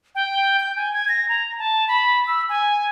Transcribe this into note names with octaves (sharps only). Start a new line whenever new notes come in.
G5
G6
G#5
G#6
A#6
A#5
A5
B5
E6
G#5